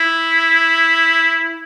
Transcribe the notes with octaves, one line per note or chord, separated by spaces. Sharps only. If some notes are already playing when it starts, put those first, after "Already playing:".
Already playing: E4